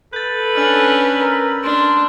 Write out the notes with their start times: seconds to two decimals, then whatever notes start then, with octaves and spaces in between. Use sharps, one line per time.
0.13 A4 B4 G6 A6
0.55 C#4 D4 E6 F6 F#7
1.20 A#4
1.64 D4 C6 D7